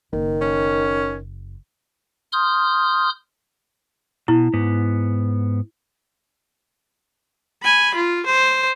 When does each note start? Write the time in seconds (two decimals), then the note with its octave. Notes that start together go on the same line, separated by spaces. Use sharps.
0.13 F#1 D#3
0.41 C#4
2.32 C6 D#6 F6 G6
4.28 B2 E4
4.53 G#2 B3
7.63 G#5 B5
7.95 F4
8.27 C5